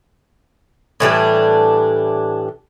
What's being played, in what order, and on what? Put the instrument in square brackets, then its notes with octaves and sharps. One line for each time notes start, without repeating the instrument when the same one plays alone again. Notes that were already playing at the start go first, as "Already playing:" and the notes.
[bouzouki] A2 E3 G3 D4